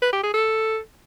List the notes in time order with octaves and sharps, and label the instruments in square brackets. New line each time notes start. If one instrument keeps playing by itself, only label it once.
[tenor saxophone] B4
G4
G#4
A4